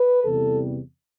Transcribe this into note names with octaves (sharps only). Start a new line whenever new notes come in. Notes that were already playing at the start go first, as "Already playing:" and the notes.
Already playing: B4
E2 C3 E3 G3 A4